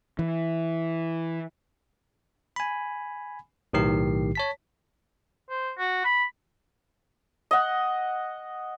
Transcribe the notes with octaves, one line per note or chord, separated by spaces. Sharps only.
E3
G#5 B5
B1 A2 D#3 G4 C7
C#5 A5 B6
C5
F#4
B5
D#5 F#5